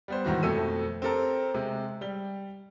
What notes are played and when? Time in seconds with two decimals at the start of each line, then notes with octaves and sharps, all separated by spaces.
0.08 G3 B3 C5
0.25 G#2 D#3 E3 F#4
0.43 F2 B2 A3 E6 D#7
1.02 C4 G4 A4 A#4
1.54 C3 G#3
2.01 G3 G7